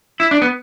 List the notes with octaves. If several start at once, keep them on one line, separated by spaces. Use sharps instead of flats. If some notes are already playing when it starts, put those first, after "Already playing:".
E4
D4
B3